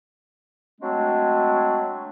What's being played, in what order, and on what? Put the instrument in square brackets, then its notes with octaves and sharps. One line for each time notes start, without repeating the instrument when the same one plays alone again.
[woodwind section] F#3 G#3 A3 C4 D4